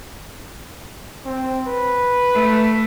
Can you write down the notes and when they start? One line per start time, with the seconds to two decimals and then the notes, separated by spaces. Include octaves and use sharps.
1.25 C4
1.67 B4
2.34 A3